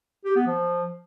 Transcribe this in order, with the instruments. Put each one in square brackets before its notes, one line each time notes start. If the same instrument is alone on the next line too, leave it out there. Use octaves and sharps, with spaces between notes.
[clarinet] G4
B3
F3